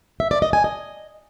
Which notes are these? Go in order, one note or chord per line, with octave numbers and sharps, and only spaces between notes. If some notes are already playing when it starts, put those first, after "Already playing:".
E5
D5
D#5
G#5
D#5